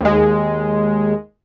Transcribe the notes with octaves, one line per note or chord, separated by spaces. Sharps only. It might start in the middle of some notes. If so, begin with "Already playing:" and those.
D#2 G#3